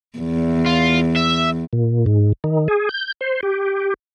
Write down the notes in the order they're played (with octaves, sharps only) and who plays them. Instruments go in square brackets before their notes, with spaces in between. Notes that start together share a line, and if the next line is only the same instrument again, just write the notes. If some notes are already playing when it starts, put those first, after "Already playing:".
[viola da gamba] E2
[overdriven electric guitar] F4
E5
[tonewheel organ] A#2
G#2
D#3
G#4
G6
C5
G4